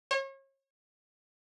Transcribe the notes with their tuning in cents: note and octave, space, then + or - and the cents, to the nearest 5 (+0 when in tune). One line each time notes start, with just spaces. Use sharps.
C#5 -35